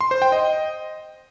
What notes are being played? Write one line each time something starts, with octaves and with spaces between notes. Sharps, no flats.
C6
C5
G5
D#5